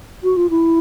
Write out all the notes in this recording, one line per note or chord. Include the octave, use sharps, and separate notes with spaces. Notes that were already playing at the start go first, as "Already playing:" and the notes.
F#4
F4
E4